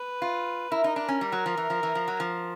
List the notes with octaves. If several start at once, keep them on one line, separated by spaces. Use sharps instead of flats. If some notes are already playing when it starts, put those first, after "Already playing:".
Already playing: B4
F4
E4 A#4
D#4
D4
C#4
G3
F#3
F3
E3
F3
E3
F3
F#3
F3